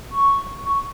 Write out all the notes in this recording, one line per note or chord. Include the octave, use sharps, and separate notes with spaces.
C#6
C#6